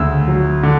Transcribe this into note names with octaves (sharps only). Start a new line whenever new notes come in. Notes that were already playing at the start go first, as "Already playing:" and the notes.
Already playing: D2 C#3 E6
F#3
D3